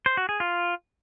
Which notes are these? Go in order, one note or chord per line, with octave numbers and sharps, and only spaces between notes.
C5
F#4
G#4
F4